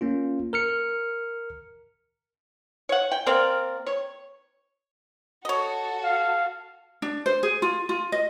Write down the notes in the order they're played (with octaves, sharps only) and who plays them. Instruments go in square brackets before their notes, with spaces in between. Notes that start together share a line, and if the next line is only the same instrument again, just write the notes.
[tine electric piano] A#3 C#4 F4
A#4 F6 C#7
[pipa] C#5 F#5
G5
A#3 C4 A#4 D5
C#5
[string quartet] F#4 A4 [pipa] C#5 D#5
[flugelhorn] F5
[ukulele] D4
C5
G#4
F4
F4
D#5